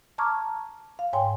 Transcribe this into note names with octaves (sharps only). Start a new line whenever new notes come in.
A5 A#5 C#6 D6 F6 G#6
F5
G#2 C#5 G5 G#5 C6